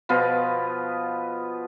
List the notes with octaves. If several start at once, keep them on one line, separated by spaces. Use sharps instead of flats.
B2 F3 B3 F4